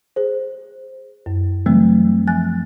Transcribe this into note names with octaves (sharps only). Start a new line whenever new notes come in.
G#4 C5
F#2
C#3 E3 F#3 G3 A3 C4
F3 G#5 F#6 A6